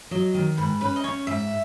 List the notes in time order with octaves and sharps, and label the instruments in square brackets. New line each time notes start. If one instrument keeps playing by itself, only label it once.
[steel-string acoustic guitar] F#3 [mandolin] D#5
[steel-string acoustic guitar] D#3
[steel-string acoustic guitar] G#2 [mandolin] B4
[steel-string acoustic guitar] C#4 [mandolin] B4
[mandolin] D#5
[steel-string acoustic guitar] C#4 [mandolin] C#5
[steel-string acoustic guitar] G#2 [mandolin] E5